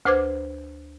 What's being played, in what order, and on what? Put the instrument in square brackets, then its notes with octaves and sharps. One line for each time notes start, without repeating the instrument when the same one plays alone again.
[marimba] D2 B4 C5 D6 F6 G#6